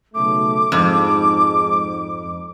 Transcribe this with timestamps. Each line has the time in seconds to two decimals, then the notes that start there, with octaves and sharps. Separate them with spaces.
0.14 B1 C#3 A3 D6
0.72 F2 G#2